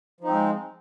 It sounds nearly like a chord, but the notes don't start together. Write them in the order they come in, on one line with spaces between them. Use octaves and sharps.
F3 D#4 C4 G#3